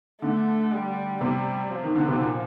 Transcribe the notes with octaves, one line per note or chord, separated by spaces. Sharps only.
D3 A3
G3
C3 G3
F3
D#3
D3
C3
A#2